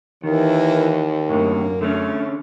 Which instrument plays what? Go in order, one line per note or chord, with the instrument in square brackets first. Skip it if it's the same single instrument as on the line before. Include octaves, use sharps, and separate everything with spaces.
[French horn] D#2 [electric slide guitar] D#3 [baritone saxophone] E3 [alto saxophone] A#4
[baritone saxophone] F#2 [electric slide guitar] A2 D3 [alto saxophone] A#3
[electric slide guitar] D3 C#4 [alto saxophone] A3